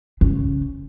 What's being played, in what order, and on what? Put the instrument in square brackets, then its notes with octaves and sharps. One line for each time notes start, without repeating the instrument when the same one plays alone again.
[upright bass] C#3